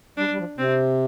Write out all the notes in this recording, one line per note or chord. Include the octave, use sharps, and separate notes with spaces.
G3 D4
G3
F3
C3 C4